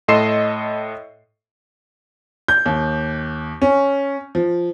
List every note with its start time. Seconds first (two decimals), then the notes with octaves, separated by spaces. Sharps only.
0.08 A2 A4 D#5 C6 C7 E7
2.48 G6
2.66 D#2
3.62 C#4
4.35 F3